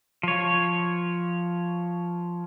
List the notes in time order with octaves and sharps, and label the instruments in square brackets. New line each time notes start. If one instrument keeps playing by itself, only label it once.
[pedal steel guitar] F3 C#5